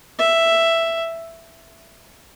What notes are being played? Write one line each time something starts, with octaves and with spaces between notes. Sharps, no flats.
E5